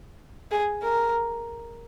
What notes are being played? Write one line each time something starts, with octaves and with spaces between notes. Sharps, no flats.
G#4
A#4